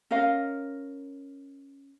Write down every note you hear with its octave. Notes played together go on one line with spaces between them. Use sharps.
C#4 A#4 D#5 F5